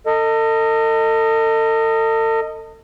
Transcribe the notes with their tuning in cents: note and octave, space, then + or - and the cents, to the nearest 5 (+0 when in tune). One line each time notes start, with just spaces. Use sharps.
A4 +40 D#5 +0